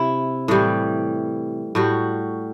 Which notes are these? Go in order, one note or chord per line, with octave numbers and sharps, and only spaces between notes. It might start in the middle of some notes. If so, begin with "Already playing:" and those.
Already playing: C3 E4
A2 E3 G3
A2 G3 F#4